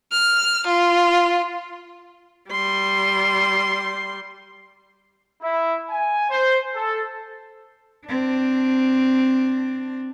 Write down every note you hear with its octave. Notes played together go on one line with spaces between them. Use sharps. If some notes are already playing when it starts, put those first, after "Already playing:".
F6
F4
G3 C6
E4
G#5
C5
A4
C4 D4